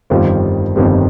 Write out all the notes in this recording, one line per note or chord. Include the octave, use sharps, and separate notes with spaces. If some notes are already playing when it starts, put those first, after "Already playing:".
G1 F2 D#3 G3 C4 F4
G1 F2 D#3 G3 C4